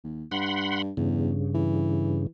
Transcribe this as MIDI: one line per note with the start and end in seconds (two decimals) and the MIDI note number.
0.04 0.24 39
0.31 0.91 43
0.31 0.82 78
0.31 0.82 83
0.31 0.82 84
0.97 1.32 40
0.97 2.27 43
0.97 2.27 49
1.55 2.28 52